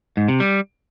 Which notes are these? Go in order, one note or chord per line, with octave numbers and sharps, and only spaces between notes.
G#2
C3
G3